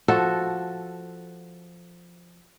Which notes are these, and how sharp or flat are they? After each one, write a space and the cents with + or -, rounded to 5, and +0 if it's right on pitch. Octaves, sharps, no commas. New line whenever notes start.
F3 +0 F#4 +0 A4 +0